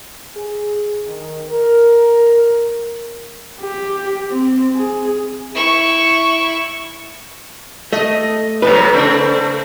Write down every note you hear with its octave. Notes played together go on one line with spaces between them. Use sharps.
G#4
D#3
A#4
G4
C4
G#4
E4 C#6
A3 D#5
G#2 C3 F#3 B4
C#3 A3 C4